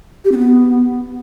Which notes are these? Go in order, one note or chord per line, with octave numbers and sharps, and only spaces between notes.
G4
C4
B3